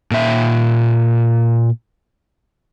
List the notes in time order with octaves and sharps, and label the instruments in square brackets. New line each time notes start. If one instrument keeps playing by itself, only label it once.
[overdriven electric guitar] A#2 E5